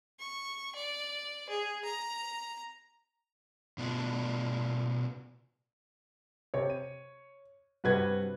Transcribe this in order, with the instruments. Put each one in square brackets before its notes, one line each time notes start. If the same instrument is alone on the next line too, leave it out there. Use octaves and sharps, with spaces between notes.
[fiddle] C#6
D5
G#4
A#5
[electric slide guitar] B2 B3 D4 F4 D5
[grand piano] C3 [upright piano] C#5
[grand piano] D#7
[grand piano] G2 C3 F#5 [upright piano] F#4 B4 G#6